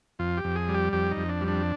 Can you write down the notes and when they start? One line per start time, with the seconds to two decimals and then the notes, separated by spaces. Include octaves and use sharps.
0.19 F2 F4
0.37 G4
0.44 F2
0.56 G#4
0.69 G3
0.74 G4
0.93 F2 G4
1.11 D#4
1.17 F2
1.29 D4
1.41 G3
1.48 D4